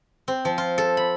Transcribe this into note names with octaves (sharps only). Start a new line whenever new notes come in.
C4
F3
F4
A4
B5